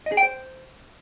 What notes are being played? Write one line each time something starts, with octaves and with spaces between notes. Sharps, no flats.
D#5
G#4
G5
C5